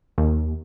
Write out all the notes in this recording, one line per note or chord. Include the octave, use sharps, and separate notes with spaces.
D#2